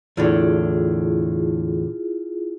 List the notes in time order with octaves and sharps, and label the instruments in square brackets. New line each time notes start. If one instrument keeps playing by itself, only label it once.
[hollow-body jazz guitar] E2 A2 D3 [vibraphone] E4 F4 G#4